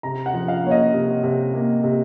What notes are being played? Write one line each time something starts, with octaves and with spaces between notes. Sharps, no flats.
C3 A#5
F#5
F3
F5
A#3 C#5
D#5
C3
C3
A#3
C3